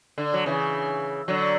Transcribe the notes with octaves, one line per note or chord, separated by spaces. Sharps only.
D3
F#3
C#3 E3
D3 F#3